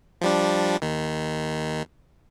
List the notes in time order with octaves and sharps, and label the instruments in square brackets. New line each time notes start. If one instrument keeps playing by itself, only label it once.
[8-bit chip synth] F3 G3 D4
D#2 D#3